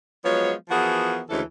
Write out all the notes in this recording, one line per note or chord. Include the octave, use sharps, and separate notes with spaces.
F3 F#3 G#3 B3 C#5
E3 F3 B3 F#4 G#4 A#4
D2 C#3 E3 G#3 A4